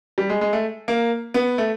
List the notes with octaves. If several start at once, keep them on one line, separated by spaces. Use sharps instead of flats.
G3
G#3
G#3
A3
A#3
B3
A3